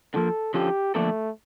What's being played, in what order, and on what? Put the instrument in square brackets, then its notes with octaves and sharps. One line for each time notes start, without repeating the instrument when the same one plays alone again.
[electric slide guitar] D3 F3 A#3 [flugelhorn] A4
[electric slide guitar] D3 F3 C#4 F4 A4 [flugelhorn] G4
[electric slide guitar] D3 F3 A#3 D4 A4 [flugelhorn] A3